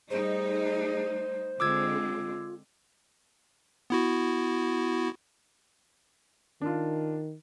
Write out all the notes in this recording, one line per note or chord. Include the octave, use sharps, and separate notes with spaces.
G3 A3 D#4 G#4 C5
D3 G#3 C4 F4 D6 E6 G#6
B3 E4 F#4
D#3 D4 F4